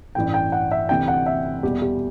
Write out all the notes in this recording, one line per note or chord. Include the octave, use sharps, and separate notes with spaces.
A1 G2 E3 G5
G5
F#5
E5
D2 C3 E3 G5
F#5
E5
E2 B2 G3 G4
G4